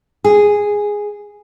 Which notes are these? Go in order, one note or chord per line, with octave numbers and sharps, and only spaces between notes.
G#4